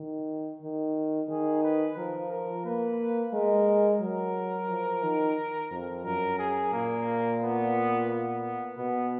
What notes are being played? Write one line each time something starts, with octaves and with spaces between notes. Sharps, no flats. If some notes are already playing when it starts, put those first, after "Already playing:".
Already playing: D#3
D#3
D#3 G#4
B4
F3 A#4
A#4
A#3 B4
G#3 A#4
F#3 A#4
F3
D#3
F2
F#2 A#4
G#4
A#2 A#3
B3
B3
B2 B3